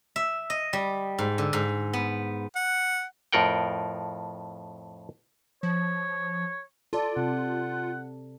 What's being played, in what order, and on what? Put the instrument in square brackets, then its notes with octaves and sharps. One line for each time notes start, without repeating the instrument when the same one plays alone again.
[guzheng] E5
D#5
G3
G#2
D3
G#2
B3
[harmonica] F#5
[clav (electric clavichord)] F2 A2 F4 A#4 F#5 G5
[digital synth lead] F3 [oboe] C#5
[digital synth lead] F4 [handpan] A4 D5
[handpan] C3 [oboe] F#5